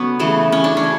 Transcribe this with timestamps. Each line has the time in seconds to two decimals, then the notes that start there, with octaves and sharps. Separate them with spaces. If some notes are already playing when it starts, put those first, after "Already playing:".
Already playing: D3 F#3 B3 C#4
0.19 C#3 E3 A3
0.52 C#4
0.64 D4
0.77 C#4
0.84 C#3